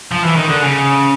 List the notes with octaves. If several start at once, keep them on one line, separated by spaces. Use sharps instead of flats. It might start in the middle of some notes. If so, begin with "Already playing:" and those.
F3
E3
D#3
D3
C#3